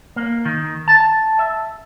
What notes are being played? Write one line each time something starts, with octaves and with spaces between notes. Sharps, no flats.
A#3
D#3
A5
E5